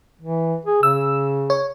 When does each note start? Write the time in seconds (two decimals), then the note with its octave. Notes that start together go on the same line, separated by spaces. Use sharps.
0.22 E3
0.65 G#4
0.83 C#3 E6
1.50 C#5